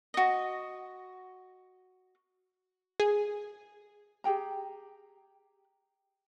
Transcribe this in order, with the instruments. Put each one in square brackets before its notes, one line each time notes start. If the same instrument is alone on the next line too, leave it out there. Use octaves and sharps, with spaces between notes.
[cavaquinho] F#4 D#5
[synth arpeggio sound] G#4
[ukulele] G4 G#4 G5 A#5